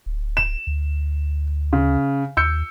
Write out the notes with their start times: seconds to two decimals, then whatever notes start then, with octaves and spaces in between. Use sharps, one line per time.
0.06 D1
0.37 E7
0.67 D2
1.73 C#3
2.37 D#2 E6 G6 C#7